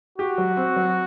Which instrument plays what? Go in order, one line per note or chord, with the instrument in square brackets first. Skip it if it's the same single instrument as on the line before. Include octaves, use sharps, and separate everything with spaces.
[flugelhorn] F#4 [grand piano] G4
[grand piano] F#3
C4
F#3